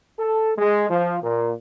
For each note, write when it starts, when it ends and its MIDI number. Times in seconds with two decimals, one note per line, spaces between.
0.19 0.52 69
0.58 0.88 56
0.90 1.18 53
1.23 1.51 46